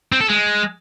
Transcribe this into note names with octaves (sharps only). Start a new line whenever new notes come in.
C4
A4
G#3